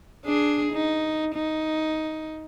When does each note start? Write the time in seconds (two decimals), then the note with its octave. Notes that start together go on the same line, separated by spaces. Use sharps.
0.25 D4 G#4
0.73 D#4
1.35 D#4